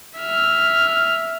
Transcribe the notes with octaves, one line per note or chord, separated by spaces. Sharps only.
E5 F6